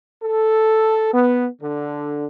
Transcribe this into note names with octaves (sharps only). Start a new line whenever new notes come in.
A4
B3
D3